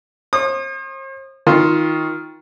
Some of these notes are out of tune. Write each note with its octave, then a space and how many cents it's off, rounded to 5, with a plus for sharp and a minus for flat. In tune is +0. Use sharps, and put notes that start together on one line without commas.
C5 +45 D#6 -30
D#3 +20 F4 +5 C6 +0